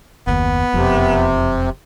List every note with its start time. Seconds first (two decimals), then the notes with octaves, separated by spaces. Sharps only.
0.27 F#1 D#2 B3
0.74 E1 F2 C3